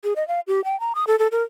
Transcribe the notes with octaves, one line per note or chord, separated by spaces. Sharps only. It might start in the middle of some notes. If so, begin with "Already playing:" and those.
G#4
D#5
F5
G4
G5
A#5
D#6
A4
A4
A#4